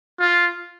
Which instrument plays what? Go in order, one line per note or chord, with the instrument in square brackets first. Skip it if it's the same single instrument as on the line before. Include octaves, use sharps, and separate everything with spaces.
[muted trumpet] F4